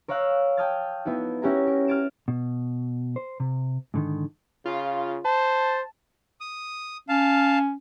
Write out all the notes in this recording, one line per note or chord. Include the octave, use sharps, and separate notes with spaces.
A#4 C#5 F5 E6 F#6
G5 A5 D#6 F6 G#6 A6
B3 D#4 E4 F#4
C#4 E4 F#4 G4 G#5 A#5
A#4
F6 G#6 A6 D7 E7
B2
C5
C3
G#2 D3 D#3
C#3 F4
C5 A5
D#6
C#4 F5 A5